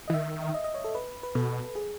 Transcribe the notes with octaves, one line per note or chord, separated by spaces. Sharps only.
E3 D#5
D#3 E5
D#5
D#5
C#5
A4
B4
B4
B2 A4
G#4